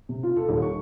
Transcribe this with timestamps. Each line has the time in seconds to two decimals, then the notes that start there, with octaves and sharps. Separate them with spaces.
0.09 C3
0.23 F4
0.36 A4
0.49 D#1
0.62 C#6